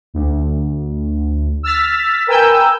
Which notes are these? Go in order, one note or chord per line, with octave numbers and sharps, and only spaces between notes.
D2
E6 F6 A6 B6
A#4 B4 G5 G#5 E6 G6